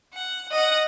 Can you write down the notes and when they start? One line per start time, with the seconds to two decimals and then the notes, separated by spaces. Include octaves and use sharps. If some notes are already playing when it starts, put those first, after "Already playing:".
0.13 F#5
0.52 D#5 F#5